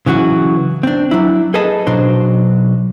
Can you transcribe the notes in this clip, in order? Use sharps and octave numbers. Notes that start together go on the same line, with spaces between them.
C#3 E3 F#3 F#4
C4 D4
F#3 D4 E4
G#4 A4 B4 D#5 A5
B1 B2 F#3 D4 C5